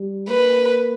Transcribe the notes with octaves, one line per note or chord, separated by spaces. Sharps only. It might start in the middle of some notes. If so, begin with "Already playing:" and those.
Already playing: G3
A#3 B4